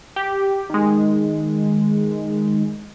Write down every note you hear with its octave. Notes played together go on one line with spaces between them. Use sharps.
G4
D#3 G#3